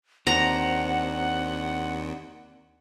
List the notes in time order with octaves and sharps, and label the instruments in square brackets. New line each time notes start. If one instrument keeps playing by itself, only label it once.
[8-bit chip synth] D#2 [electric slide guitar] C4 D4 [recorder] F#5 [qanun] A#5